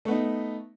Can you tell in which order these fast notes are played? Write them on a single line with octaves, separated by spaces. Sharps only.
A3 B3 D#4